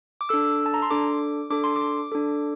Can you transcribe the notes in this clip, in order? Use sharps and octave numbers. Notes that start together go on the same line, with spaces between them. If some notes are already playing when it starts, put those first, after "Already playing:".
D6
D4 A4 E6
A5
A#5
C6
D4 A4 D6
D4 A4 D6
C6
D6
D4 A4